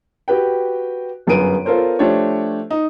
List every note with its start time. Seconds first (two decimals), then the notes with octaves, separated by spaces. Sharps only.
0.28 F#4 G4 B4 G5
1.27 G1 F#2 G#4 B4 D7 D#7
1.65 B3 F4 A4 A#4 C5 C#5
1.99 F3 A3 D4 G4 C5 C#5
2.71 D#4